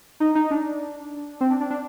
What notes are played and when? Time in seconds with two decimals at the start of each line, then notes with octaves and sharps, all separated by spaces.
0.20 D#4
0.35 D#4
0.51 D4
1.41 C4
1.50 D4
1.60 D4
1.71 D4